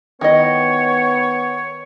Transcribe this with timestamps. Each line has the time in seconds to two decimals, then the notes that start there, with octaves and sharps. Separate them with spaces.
0.21 D#3 B3 E4 C#5 D#5